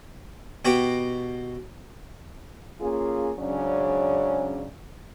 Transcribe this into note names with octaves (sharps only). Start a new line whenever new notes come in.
B2 F#4 G4 G5
A#3 C#4 F4 G#4
G#2 C#3 F#3 C#4 D4 D5